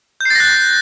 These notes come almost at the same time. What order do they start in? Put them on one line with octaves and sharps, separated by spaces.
G6 C7 A6 A#6 F#6